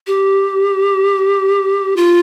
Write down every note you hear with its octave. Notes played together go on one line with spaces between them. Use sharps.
G4
F4